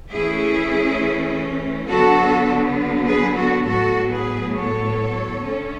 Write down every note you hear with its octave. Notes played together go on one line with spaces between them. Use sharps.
E3 A3 C#4 E4 G#4
D3 F#3 B3 F#4 A4
G#4 B4
F#4 A4
A2 F#3 B3 F#4 A4
G#4 B4
A4 C#5
D3 A3 C#4